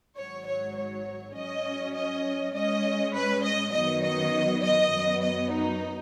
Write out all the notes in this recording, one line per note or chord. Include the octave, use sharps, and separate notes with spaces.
G#1 G#2 F#3 C#5
C#5
C#5
G#2 F#3 C#4 D#5
D#5
G#2 G#3 C#4 D#5
B4
D#5
F#2 D#3 F#3 B3 D#5
D#5
D#5
F#2 F#3 B3
D#5
D#4